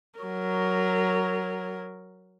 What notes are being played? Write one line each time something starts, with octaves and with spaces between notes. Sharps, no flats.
F#3 A#4